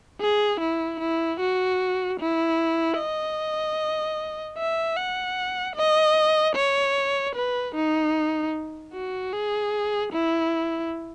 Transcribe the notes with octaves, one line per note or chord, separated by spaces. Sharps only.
G#4
E4
E4
F#4
E4
D#5
E5
F#5
D#5
C#5
B4
D#4
F#4
G#4
E4